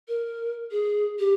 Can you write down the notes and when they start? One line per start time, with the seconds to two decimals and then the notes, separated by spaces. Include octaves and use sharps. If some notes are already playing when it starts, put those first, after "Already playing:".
0.08 A#4
0.71 G#4
1.19 G4